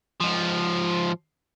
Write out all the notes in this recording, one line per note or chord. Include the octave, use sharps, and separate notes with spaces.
G#2 F3